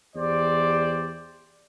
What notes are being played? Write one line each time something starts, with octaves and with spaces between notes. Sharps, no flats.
E2 G4 C5 D5